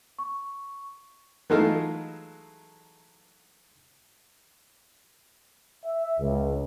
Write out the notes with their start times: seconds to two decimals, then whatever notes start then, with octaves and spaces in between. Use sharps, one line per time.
0.19 C#6
1.50 E3 F#3 G#3 A3 D#4 F4
5.85 E5
6.20 C#2